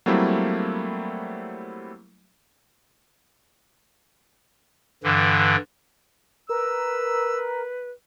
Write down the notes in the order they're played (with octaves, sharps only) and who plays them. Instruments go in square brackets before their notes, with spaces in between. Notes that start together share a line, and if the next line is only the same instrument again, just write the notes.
[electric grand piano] F#3 G3 A3 A#3 C4 E4
[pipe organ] G2 D3 E3
[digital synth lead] A#4 [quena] B4 [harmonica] E6